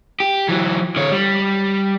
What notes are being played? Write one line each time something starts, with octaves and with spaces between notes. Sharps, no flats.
G4
E3 F#3
D3 C#5
G3